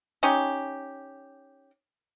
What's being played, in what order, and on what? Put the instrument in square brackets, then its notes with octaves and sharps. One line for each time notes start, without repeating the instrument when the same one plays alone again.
[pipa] C#4 D#4 G4